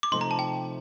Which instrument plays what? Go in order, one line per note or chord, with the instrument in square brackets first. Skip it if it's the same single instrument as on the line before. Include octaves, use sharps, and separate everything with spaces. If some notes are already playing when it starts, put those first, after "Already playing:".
[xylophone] D6
[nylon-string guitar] C3 F3 A3 C4 D#4 [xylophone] C6
[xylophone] A#5
A5
G5